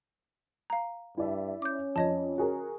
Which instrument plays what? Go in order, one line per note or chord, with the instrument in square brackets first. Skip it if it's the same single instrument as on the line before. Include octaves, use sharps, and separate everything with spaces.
[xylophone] F5 A#5
[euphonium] G2 [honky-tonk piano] E4 D5 E5
[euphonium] C#4 [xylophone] D6 G6
[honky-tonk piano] F2 [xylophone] C#5 D#5 A5
[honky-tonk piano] F#4 G#4 A#4